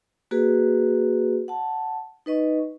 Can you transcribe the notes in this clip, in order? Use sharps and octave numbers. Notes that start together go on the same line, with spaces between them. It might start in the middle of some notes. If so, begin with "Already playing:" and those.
A#3 F#4 G#4 B4
F#5 A5
D#4 B4 D#5 C#6